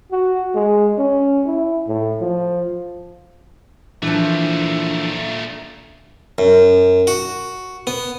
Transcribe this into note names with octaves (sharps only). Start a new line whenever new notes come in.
F#4
G#3
C#4
E4
A2
F3
A#2 E3 F3 A3 D4
F#2
F#4
B3